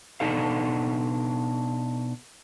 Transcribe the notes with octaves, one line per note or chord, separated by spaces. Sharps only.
B2 B3 D4 D#4 A4 F5